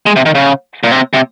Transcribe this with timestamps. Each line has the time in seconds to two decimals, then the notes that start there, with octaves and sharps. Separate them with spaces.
0.06 G#3
0.16 C3
0.25 D#3
0.35 C#3
0.84 A#2
0.91 C3
1.14 C3